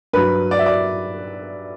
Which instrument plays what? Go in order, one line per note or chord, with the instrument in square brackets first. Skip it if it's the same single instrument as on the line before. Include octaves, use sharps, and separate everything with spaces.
[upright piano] G2 F#3 B4
D5
E5
D5